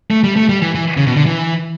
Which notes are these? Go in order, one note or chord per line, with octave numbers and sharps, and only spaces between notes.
A3
G3
A3
G3
E3
E3
C#3
B2
D3
E3